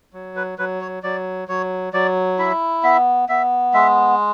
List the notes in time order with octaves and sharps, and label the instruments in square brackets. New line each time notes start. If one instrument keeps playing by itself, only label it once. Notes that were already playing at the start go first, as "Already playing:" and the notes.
[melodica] F#3
B4
F#3 B4
C#5
F#3 D5
F#3 C#5
F#3 D5
E4 E5
B3 E5
B3 E5
G#3 E5